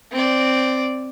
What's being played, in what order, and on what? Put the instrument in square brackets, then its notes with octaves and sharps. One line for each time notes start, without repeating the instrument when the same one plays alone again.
[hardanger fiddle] C4 D5